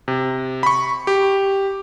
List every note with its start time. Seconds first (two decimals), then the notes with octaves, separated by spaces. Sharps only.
0.08 C3
0.63 B5 C#6
1.07 G4